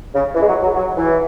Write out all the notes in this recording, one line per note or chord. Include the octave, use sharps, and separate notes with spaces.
C#3
E3
G#3
F#3
F#3
F#3
E3